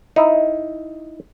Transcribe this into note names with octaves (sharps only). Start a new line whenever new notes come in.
D#4 E4